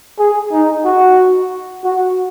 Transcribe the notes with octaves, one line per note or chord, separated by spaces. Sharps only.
G#4
D#4
F#4
F#4